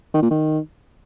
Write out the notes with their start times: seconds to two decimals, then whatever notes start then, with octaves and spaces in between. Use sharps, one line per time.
0.14 D#3
0.22 A#2
0.31 D#3